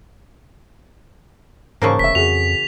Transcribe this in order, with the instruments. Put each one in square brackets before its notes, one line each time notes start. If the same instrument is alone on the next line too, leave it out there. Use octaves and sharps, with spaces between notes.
[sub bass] G#2 [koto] C#3 E3 A#3 [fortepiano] C5 A5 C#6
[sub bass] F1 [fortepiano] E5 C#6 [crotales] B6
[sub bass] F2 [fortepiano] F#4 G#4 [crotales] F7